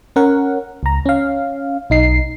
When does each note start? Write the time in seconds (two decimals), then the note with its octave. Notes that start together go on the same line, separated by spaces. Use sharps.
0.16 C#4 A#4 F#5
0.83 C#2 A#5
1.06 C#4 F5
1.90 B1 D#4 C7